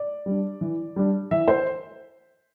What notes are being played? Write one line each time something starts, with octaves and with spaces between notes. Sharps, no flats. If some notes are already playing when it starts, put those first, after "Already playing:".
Already playing: D5
G3 D4
E3
G3 D4
E3 E5
C5